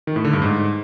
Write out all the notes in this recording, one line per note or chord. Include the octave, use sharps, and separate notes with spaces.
D#3
A2
D3
G2
G#2